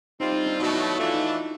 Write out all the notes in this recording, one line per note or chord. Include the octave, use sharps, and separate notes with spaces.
G3 C4 D#4 F4
D#4
D4
B2 F#3 A3 D#4
E4
F#4
E3 A3 D4 F4
E4
D#4
E4